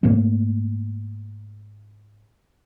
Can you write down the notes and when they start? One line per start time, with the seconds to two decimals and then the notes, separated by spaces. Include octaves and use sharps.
0.03 G#2 A3 A#3 C4